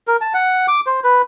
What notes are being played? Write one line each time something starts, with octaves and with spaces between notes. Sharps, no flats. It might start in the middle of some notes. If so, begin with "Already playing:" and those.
A#4
A5
F#5
D6
C5
B4